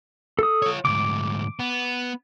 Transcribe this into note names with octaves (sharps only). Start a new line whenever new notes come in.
A4 D#6
F4 C#5
D2 G#2 D6
B3